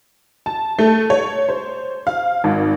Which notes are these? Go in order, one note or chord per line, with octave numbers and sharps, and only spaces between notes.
A5
A3
C#5
C5
F5
G#1